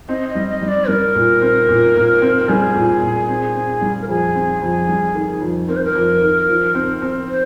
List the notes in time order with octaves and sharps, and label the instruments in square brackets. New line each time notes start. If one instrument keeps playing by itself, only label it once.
[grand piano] C4 [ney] D#5
[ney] D#5
[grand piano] G3
[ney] D#5
[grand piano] G3
[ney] D5
[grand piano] G3 [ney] A#4
[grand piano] A#2
C4
A#2
A#2
C4
[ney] A#4
[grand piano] G3 [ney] G#4
[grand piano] A#2
A#2
C4
C4
G3
[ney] A#4
[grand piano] F2 [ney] G#4
[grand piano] C4
F2
G3
D#3
F2
[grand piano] C4 [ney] A#4
[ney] C5
A#4
[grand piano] F2
D#3
F3
C4
C4
[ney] C5